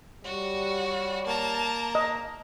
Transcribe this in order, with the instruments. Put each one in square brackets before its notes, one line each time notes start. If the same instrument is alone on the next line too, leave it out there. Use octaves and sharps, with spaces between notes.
[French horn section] G3 C#5 [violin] F#4
[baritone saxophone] A#3 [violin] A5 A#5
[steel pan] D#5